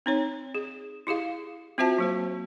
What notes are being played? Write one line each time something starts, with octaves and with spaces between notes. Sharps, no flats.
C4 D#4 C#5
G#4
E4 G4 G#4 F5
C4 F4 F#4 C5 E5 A5
F#3 A#3 C5